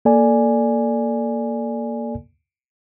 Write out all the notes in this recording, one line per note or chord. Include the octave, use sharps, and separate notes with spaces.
A#3 A4 D5 G#5